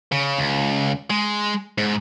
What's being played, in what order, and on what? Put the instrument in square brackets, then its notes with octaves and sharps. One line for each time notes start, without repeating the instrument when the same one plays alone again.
[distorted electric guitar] C#3
C#2
G#3
G#2